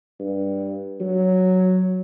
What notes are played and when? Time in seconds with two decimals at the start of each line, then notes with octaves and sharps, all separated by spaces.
0.20 G2
1.01 F#3